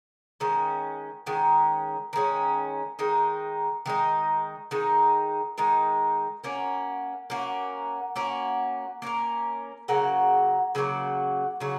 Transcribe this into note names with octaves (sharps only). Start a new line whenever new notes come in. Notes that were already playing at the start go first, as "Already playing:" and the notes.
D#3 G#3 C#4
D#3 G#3 C#4
D#3 G#3 C#4
D#3 G#3 D#4
D#3 G#3 D#4
D#3 G#3 D#4
D#3 G#3 D#4
A#3 C#4 F#4 A#4
A#3 C#4 F#4 A#4
A#3 C#4 F#4 A#4
A#3 C#4 F#4 A#4
C#3 F#3 A#3 F#4
C#3 F#3 A#3 F#4
C#3 F#3 A#3 F#4